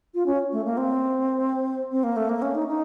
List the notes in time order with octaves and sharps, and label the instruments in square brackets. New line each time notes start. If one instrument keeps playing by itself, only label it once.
[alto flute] F4
C#4
A3
A#3
C4
C4
A#3
A3
A#3
C#4
D#4
D#4